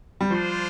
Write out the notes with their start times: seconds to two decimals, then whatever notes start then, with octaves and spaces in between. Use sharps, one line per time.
0.21 G3
0.30 F3 D4 F4 C5